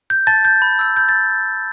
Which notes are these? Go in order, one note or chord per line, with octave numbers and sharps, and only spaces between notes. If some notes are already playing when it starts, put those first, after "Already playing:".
G6
A5 A6
G6
B5
E6 G6
B5 G6
A6